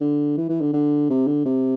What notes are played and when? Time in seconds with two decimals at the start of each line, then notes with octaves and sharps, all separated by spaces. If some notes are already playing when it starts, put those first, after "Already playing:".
0.01 D3
0.37 E3
0.49 E3
0.61 D3
0.73 D3
1.09 C3
1.27 D3
1.45 C3